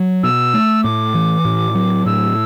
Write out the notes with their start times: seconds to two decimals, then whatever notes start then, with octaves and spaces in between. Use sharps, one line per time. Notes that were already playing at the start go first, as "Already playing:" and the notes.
Already playing: F#3
0.23 B2 E6
0.54 A3
0.84 A2 D6
1.14 E3
1.45 A2
1.75 F#3
2.06 A2 E6